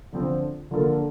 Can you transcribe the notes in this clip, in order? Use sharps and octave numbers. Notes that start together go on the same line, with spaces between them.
D3 F3 C4 F4
D3 F3 A#3 F4 A4